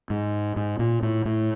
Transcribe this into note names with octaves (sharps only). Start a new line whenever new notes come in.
G#2
G#2
A#2
A2
A2